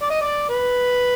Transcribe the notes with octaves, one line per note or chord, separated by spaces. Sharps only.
D5
D#5
D5
B4